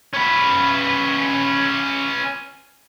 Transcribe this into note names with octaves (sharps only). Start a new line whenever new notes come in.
C#4 B4